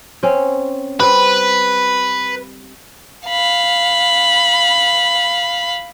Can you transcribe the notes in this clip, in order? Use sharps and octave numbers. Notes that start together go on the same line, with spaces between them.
C4 C#4
G3 C4 B4
F5 B5